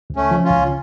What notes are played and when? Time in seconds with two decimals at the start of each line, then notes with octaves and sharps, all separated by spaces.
0.10 C#2
0.16 A3 C#4
0.31 F3
0.44 C#4 F4
0.51 C#2